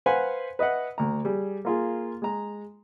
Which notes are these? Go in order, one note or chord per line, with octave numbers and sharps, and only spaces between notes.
B4 C5 F5 F#5 G#5 C6
B4 D#5 E5 F#5
D2 A#5
G3 G#4
A#3 F4 G#4
G#3 A#5